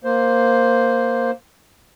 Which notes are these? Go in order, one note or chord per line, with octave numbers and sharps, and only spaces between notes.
A#3 C5